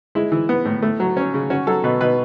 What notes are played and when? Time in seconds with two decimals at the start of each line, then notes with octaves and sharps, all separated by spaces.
0.15 G#3 E4
0.32 E3
0.49 B3
0.65 A2
0.82 A3
1.00 F#3
1.17 C#4
1.34 C#3
1.50 C#4 F#4
1.67 F#3 A4
1.84 B2 B4
2.01 B2 B4